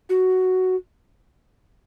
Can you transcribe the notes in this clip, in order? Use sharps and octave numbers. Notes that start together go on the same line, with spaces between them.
F#4